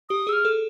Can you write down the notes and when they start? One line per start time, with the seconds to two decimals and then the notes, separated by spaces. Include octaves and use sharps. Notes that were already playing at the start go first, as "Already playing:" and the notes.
0.10 G4 D#6
0.27 G#4 E6
0.33 F6
0.45 A4